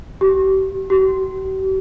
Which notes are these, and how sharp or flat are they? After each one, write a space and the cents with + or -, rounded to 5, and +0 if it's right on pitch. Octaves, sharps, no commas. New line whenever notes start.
G4 -35
G4 -45